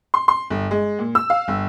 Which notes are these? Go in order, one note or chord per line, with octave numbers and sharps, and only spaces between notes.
C6
C6
G1
G#3
A#2
E6
F5
G1